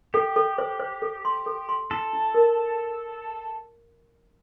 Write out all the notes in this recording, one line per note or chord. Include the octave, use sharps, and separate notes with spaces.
G4 A4
A4
C5
C5
A4
C6
A4
C6
E4 A4
E4
A#4